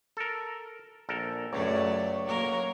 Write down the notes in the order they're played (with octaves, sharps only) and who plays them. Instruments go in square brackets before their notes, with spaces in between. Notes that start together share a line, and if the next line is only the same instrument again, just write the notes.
[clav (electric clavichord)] A4 A#4
A#1 A4 A#4
[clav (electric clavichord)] C#2 [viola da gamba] F#2 A3 D5 [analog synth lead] C#5
[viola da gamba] F#3 A#3 A#4